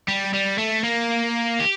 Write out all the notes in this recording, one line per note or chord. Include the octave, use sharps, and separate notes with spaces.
G3
G3
A3
A#3
G4